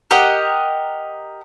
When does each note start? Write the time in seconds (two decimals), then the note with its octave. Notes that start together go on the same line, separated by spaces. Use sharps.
0.11 G4 A#4 D#5 F#5